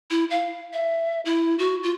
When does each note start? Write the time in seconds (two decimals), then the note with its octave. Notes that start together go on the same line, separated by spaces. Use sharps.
0.10 E4
0.30 F5
0.73 E5
1.25 E4
1.59 F#4
1.83 F4